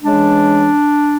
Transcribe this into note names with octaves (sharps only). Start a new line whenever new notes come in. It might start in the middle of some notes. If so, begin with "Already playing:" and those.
C#3 E3 G#3 D4